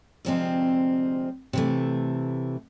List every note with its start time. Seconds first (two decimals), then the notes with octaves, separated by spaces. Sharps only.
0.25 D2 C3 F3 G#3 C4
1.53 C3 E3 A3